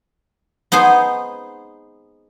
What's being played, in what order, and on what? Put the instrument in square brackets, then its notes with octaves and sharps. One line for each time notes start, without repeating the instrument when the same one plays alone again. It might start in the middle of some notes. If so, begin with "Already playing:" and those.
[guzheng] B3 D#4 G#4 C5